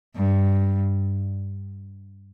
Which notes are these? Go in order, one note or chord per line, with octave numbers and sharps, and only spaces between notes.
G2